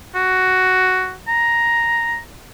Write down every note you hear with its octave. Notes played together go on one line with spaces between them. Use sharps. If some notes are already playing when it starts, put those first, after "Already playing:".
F#4
A#5